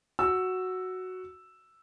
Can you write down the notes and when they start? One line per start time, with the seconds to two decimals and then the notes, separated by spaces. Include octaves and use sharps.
0.19 F#4 E6